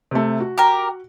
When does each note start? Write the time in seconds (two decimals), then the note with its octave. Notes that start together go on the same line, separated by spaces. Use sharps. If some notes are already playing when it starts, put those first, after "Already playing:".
0.11 C3 A3
0.40 F#4
0.58 G4 A#4